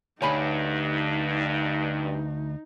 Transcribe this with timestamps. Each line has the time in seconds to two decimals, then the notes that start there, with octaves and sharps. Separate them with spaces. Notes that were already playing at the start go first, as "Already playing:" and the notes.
0.22 D2 G2 D#4 C#5 G#5 B5